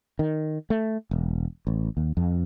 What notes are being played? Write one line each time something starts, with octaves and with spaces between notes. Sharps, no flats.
D#3
A3
E1
A1
D#2
F2